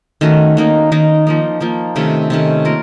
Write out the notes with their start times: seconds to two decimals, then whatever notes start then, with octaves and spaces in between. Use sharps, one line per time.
0.21 D#3 A3 C#4 F#4
0.57 D#3 A#3 D#4
0.92 D#3 A#3 D#4
1.27 F3 A#3 D#4
1.60 F3 A#3 D#4
1.96 C3 D#3 A3 C#4
2.30 C3 D#3 A3 C#4
2.65 A#3 F4 A#4